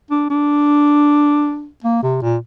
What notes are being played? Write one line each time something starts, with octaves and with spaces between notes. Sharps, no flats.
D4
D4
A#3
C3
A#2